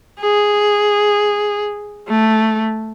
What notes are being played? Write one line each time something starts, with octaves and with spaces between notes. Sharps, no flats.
G#4
A3